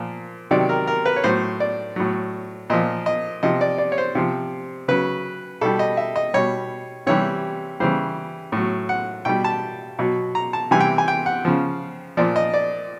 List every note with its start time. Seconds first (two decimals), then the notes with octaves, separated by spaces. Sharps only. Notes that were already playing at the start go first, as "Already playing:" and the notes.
Already playing: A#2 F3
0.51 C3 D#3 F#3 D5
0.69 A#4
0.87 A#4
1.06 B4
1.16 C#5
1.24 A2 F#3 C5
1.60 D5
1.96 A2 F#3
2.70 A#2 F3 D#5
3.06 D#5
3.43 C3 F3 D#5
3.61 D5
3.78 D5
3.92 C#5
3.98 C5
4.15 C3 F3
4.88 C#3 F#3 B4
5.61 B2 G3 A4
5.79 D#5
5.97 E5
6.16 D#5
6.34 B2 G3 C#5
7.07 C3 E3 G3 C#5
7.80 C#3 E3 G3 C5
8.52 A2 F#3
8.89 F#5
9.25 B2 G3 G5
9.44 A5
9.99 B2 F#3
10.35 A#5
10.53 A5
10.71 C3 E3 G3 G#5
10.80 G5
10.98 G#5
11.08 G5
11.26 F#5
11.45 C#3 F3
12.17 A#2 F3 D5
12.36 D#5
12.54 D5